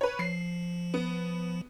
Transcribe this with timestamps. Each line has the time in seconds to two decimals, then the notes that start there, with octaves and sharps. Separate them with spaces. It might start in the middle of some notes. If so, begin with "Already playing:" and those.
0.01 B4 C#5
0.19 F3 C7
0.94 B3